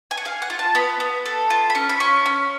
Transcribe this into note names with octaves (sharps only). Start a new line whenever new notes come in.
G#5
F#5
G#4 F5
F#5
F4
A5
B3 B5
B3
A4
F4
B5
C#4 C#6
B5
C#4 C#6
C#4